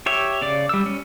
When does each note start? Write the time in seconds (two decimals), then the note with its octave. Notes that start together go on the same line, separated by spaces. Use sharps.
0.06 G4 C#5 E5
0.42 C#3 D5 D6
0.69 G3 E6
0.86 C#4